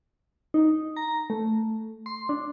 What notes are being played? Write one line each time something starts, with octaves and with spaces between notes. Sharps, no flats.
D#4
A#5
A3
C6
D4